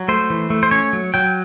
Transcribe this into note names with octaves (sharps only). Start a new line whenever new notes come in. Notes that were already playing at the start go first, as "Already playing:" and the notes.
Already playing: F#3
A3 C5
E3
A3
C5
C#4 C#5
F#3
F#3 G5